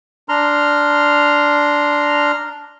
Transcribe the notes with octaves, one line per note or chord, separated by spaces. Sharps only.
D4 A#5 C6 F6